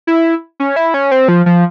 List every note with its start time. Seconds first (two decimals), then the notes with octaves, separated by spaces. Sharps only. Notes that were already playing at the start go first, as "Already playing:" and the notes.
0.07 E4
0.60 C#4
0.76 E4
0.94 C#4
1.11 C4
1.28 F3
1.46 F3